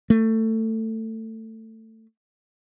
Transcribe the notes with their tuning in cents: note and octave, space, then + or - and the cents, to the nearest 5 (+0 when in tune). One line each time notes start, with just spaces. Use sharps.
A3 +20